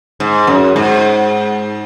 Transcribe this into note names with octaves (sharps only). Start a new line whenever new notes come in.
G#2
F#2
G#2